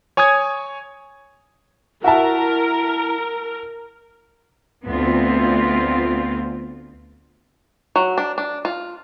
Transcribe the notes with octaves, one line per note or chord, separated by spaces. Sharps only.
C#5 G#5 C#6 D#6 G#6
E4 F#4 A#4 E5 A5
D2 B3 C4 F4
F#3
D4
D4
F4